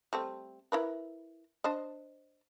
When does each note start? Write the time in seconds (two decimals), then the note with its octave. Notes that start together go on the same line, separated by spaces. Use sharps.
0.13 G3 A3 C4
0.72 E4 A#4 B4
1.64 D4 C5 D#5